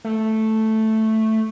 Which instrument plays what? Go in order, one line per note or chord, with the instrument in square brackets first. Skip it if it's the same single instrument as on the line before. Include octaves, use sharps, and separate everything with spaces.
[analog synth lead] A3